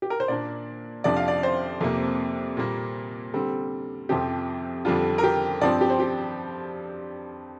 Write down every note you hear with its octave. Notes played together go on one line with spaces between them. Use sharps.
G4
A#4
C5
A#2 A#3 D4 D5
F2 C3 F3 D4 D5
F5
D5
C5
F2 C3 A#3
A#2 G3 A#3
D3 G3 C4
F2 C3 F3 C4 G4
F2 D3 G3 D4 F4
A#4
G4
G2 F3 C4 D5
G4
C5
G4